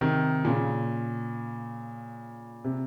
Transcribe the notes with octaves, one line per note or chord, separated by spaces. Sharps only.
C3 D#3
A#2 C#3
C3